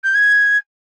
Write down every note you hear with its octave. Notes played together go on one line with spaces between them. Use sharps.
G6
G#6